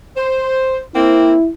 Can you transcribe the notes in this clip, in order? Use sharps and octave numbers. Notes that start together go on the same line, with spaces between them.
C5
A#3 C4 E4